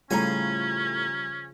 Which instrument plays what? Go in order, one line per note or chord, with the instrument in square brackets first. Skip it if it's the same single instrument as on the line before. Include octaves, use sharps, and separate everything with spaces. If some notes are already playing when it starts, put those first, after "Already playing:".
[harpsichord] A2 G#5 [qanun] C#3 F3 [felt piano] G3 A#5 [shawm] C#4